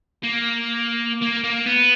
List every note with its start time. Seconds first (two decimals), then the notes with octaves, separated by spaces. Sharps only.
0.23 A#3
1.22 A#3
1.44 A#3
1.66 B3